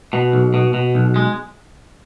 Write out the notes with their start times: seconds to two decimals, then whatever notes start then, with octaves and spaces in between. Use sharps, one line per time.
0.13 B2
0.33 B1
0.54 B2
0.74 B2
0.95 B1
1.16 G#3